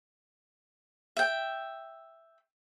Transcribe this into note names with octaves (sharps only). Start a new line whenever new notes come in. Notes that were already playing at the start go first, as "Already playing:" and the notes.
E5 G5